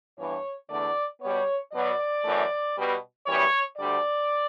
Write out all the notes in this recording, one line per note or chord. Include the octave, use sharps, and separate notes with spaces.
G2 E3 B3 C#5
E2 D3 A3 D5
B2 G3 B3 C#5
B2 F#3 B3 D5
F#2 E3 A3
B2 G3 B3
F#2 E3 G3 B3 C#5
D2 D3 G3 D5